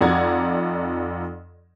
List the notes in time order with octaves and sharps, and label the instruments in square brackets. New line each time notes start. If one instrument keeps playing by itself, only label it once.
[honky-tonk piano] F2 D#4 D5 F#5 A#5 G#6